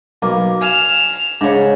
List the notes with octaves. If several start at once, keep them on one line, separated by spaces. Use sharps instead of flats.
B1 A#3
F5 G#5 F6 E7
G#2 C#3 D4 C#5